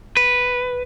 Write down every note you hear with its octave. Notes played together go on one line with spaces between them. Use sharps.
B4